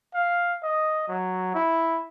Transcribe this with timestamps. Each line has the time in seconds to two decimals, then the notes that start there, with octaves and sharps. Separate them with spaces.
0.15 F5
0.63 D#5
1.08 F#3
1.55 E4